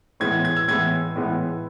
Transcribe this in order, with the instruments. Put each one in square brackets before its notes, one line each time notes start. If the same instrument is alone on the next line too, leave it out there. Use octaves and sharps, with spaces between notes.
[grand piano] A2 E3 G#3 B3 G#6
G#6
E6
A2 E3 G#3 B3 G#6
A2 E3 G#3 B3